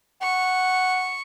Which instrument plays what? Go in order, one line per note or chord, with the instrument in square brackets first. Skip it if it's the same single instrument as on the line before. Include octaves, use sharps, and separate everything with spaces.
[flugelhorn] F#5 [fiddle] C#6